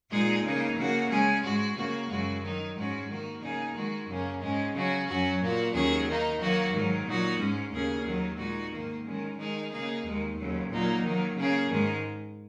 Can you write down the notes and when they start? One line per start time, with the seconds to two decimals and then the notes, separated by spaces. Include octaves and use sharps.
0.10 A#2 G#3 D#4 G#4
0.43 C#3 A#3 D#4
0.76 C#3 A#3 F#4
1.10 C#3 G#3 C#4 G#4
1.43 G#2 G#3 F#4
1.76 C#3 A#3 F#4
2.09 F#2 C#3 G#3 F#4
2.42 D#3 F#3 D#4
2.75 G#2 G#3 C#4 F#4
3.08 D#3 A#3 F#4
3.41 C#3 A#3 D#4 G#4
3.74 D#3 G#3 F#4
4.08 F#2 C#3 A#3 C#4
4.41 G#2 G#3 C#4
4.74 C#3 F#3 C#4 F#4
5.07 F#2 F#3 C#4 F#4
5.40 A#2 A#3 F#4
5.73 D#2 D#3 F#3 C#4 G#4
6.06 D#3 A#3 D#4
6.39 D#3 F#3 A#3 F#4
6.72 G#2 D#3 F#3
7.05 A#2 F#3 D#4 F#4
7.39 G#2 G#3 C#4
7.71 D#2 C#3 A#3 C#4 G#4
8.05 D#2 D#3 F#3
8.38 A#2 G#3 D#4 F#4
8.71 G#2 D#3 A#3
9.05 D#3 G#3 C#4
9.37 D#3 G#3 D#4 G#4
9.70 C#3 A#3 D#4 G#4
10.04 D#2 D#3 G#3
10.37 D#2 C#3 F#3
10.70 A#2 F#3 A#3 D#4
11.03 D#3 F#3 A#3
11.36 C#3 A#3 C#4 G#4
11.70 G#2 D#3 G#3